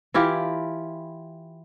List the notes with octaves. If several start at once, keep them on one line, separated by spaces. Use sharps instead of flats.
E3 E4 F4 G4